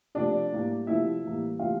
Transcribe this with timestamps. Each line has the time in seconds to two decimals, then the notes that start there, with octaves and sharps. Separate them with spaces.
0.15 C3 F3 A3 D4 D5
0.51 A2 G3 A#3
0.87 C3 F3 A3 E4 E5
1.23 A2 E3 G3 A#3
1.59 C3 E3 A3 F4 F5